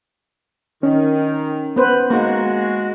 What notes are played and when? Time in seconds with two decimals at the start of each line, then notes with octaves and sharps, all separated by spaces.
0.83 D#3 C#4
1.76 B3 B4 C5
2.10 G#3 A#3 D#4 F#4